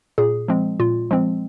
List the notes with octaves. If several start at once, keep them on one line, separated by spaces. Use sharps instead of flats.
A#2 G#4
F3 G#3 C4
A#2 F4
F3 G#3 C4